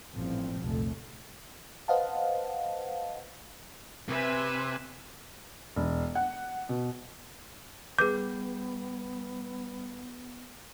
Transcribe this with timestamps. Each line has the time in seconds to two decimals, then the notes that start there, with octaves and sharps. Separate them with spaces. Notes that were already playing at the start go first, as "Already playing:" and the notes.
0.12 A1 G2 A#2 F3 C4
0.61 F1 C2 A#2 A3
1.88 B4 C5 D#5 F5 F#5 A5
4.09 C3 B4 E5 G#5
5.76 E1
6.15 F#5
6.69 B2
7.99 G3 B3 G#4 B4 D6 G6